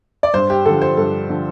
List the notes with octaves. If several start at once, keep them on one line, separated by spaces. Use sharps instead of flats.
D5
G2 C5
G4
D3 F3 A4
C5
G2 A4
D3 F3